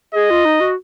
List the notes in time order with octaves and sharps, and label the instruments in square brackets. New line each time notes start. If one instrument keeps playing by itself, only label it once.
[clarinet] G#4 [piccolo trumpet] D#5
[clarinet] F4
D#4
F#4